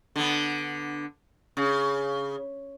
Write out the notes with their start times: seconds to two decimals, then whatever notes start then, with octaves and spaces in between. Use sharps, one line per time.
0.16 D3 B3
1.57 C#3